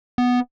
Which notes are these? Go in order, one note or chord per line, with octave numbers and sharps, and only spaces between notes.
B3